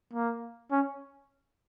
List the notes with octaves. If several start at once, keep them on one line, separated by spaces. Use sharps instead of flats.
A#3
C#4